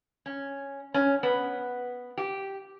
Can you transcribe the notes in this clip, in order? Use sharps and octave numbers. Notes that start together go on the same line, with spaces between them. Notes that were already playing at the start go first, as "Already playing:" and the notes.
C#4
C#4
B3
G4